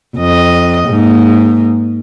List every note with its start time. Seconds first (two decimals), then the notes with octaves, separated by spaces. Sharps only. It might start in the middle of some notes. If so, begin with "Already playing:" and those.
0.16 F2 D#5
0.89 G#2 A#3